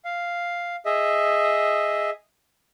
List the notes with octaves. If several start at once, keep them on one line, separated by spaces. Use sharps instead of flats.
F5
G#4 D#5 E5